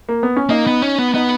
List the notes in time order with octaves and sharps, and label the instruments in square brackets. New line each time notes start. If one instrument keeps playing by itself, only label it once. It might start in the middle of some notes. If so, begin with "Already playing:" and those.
[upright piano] A#3
B3
C#4
[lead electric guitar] A#3 [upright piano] D#4
[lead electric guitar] B3
C#4
B3
[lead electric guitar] B3 [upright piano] D#4